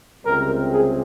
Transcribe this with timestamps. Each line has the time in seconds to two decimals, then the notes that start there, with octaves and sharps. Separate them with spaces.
0.25 C#2 C3 G3 C4 A#4
0.69 G#4